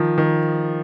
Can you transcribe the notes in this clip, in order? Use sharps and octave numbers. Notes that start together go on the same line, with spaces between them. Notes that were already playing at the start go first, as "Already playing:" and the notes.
Already playing: D#3 F3
D#3